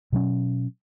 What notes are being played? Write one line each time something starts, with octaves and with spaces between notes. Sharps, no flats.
B2 F#3 C#4